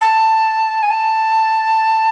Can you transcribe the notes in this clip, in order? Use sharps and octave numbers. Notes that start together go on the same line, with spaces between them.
A5
G#5
A5